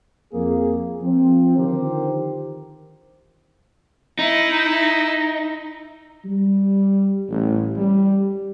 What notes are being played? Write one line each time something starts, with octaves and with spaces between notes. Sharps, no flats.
F2 A#3 G#4
F3 C4
D3 D#3 F3 G4 A#4 C5
D#4 E4
G3
A1
G3